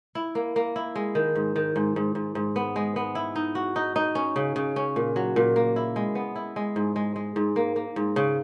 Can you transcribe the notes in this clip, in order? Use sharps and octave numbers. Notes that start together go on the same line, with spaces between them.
E4
A#3
A#3
E4
G#3
D#3
G#2
D#3
G#2
G#2
G#2
G#2
B3
G#3
B3
E4
D#4
F#4
D#4
D#4
C#4
C#3
C#3
C#4
A#2
F#3
A#2
A#3
E4
G#3
B3
E4
G#3
G#2
G#3
G#3
G#2
A#3
A#3
G#2
C#3